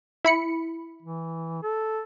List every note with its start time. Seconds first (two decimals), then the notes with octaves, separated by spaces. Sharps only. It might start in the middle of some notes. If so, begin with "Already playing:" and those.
0.25 E4 B5 C#7
1.02 E3
1.63 A4